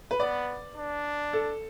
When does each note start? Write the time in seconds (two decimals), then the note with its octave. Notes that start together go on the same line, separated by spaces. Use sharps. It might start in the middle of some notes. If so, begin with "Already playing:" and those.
0.11 B4
0.20 B3 D5
0.76 D4
1.33 A4